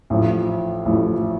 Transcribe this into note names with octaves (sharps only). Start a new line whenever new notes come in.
A1 A2 F3
A1 A2 F3